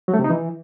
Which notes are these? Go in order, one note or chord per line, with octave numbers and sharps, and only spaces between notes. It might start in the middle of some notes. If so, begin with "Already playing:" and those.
F#3
A3
C3
D#4
E3